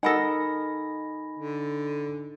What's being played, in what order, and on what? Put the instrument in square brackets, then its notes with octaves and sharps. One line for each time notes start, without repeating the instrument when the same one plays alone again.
[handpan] D#4 D#5 [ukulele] A4 A#4 F#5 [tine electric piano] G#5 B5 A#6
[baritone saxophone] D3